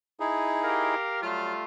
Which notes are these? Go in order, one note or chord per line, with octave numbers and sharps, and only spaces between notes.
D#4 E4 G#4
G4 A#4 F5
F#3 G3 A3 F4 F6